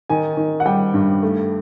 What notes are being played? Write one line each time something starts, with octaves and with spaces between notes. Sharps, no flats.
D#3 G#5
D#3
F#5
G3 G5
G2
A3